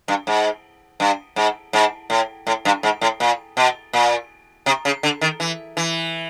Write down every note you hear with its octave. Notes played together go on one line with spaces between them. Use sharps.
G2
G#2
G2
G#2
G#2
A2
A2
G2
G#2
A2
A#2
B2
A#2
C3
C#3
D3
D#3
E3
E3